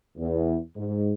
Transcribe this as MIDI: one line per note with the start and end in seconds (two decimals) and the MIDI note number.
0.17 0.57 40
0.76 1.12 44